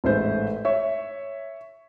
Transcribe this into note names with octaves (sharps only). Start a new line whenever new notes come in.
A1 G#2 A3 B4 C5
C#5 E5